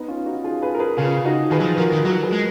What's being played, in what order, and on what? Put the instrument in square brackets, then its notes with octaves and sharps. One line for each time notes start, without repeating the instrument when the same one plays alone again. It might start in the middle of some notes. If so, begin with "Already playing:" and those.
Already playing: [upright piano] B3 D#4
C#4 F4
D#4 F#4
F4 G#4
G#4 B4
A#4
G#4 B4
[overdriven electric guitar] C#3 [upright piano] F4 G#4
[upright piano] D#4 F#4
[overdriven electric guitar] D#3 [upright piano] G#4 B4
[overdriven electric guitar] F#3
F3
[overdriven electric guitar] F3 [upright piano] F#4 A#4
[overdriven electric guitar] D#3
[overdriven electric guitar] F#3 [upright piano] F#4 A#4
[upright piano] G#4 B4
[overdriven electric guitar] G#3